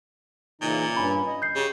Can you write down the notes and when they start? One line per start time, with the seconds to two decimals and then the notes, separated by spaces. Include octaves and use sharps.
0.61 A#2 C#3 E3 D#4
0.97 G2 C#4 B5
1.26 D#5
1.42 G6 C7
1.55 C#3 G4